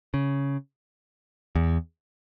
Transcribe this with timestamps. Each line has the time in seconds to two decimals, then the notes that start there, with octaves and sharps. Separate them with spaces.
0.14 C#3
1.55 E2